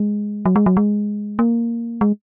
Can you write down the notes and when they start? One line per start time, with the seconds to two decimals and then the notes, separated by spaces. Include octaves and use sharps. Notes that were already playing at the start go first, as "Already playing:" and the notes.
Already playing: G#3
0.46 F#3
0.56 G#3
0.66 F#3
0.77 G#3
1.39 A#3
2.01 G#3